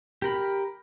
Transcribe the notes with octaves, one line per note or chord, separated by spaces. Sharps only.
G4 A#4 B5